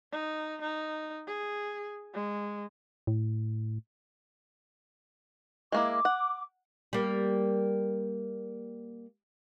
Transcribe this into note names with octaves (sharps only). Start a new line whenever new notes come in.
D#4
D#4
G#4
G#3
A2
G#3 A#3 E4 D6
F#5
G3 A#3